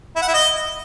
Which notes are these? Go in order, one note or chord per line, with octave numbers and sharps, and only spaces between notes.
E4
F#5
E4
D#5